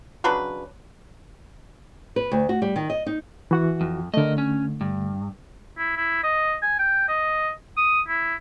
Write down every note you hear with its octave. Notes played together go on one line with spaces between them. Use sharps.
C#3 F#3 D4 B4
B4
D2
F#4
G3
D#3
D#5
D#4
E3 F#4 F#5
F2
D3 A3 A#4 D#5
C#4
G2
E4
E4
D#5
G#5
G5
D#5
D#6
E4